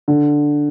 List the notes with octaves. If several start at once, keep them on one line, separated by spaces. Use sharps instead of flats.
D3